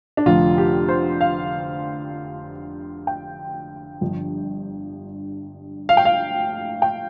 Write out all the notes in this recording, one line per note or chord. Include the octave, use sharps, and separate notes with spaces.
D4
F1 F2 D3 F3 F4
G4
C5
F5
G5
G1 G2 F3
F5
G5
F5
G5